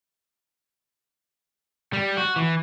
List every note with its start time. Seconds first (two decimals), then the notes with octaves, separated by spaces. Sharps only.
1.93 G3
2.17 F#4
2.36 E3